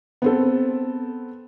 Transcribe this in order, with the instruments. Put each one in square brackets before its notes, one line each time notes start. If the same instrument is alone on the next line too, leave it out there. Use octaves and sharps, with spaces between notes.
[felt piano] B3 C4 A4